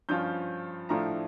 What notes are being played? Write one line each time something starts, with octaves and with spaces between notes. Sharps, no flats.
G2 F3 C#4 F4 G6
A2 F3 A3 D4 F4 A#5